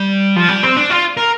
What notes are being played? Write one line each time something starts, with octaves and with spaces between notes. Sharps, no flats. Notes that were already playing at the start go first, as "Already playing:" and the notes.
Already playing: G3
F3
G3
C4
D4
F4
A#4